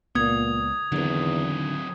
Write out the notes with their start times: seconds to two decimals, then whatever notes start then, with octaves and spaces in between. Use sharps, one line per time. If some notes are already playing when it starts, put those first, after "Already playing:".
0.15 C#2 A#2 B3 D#6 G#6
0.92 E2 D3 D#3 F#3 C4